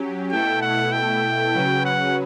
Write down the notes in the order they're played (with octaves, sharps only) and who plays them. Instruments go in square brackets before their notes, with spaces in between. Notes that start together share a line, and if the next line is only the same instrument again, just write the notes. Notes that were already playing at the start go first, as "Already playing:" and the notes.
Already playing: [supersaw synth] F#3 C#4 G4
[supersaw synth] B2 A3 E4 A4 [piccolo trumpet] G5
[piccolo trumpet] F#5
G5
[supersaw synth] C#3 F#3 C#4 F#4 B4
[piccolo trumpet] F#5